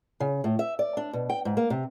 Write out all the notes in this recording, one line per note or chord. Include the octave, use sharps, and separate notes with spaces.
C#3
A2
E5
D5
D4
B2
G5
G#2
A#3
C3